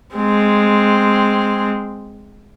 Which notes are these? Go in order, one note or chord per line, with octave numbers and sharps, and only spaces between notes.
G#3 C4